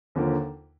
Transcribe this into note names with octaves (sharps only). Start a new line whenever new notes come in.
D#2 D3 F3 A#3